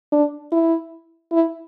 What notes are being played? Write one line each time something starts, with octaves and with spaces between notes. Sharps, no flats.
D4
E4
E4